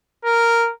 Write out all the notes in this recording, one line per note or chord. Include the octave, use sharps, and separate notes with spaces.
A#4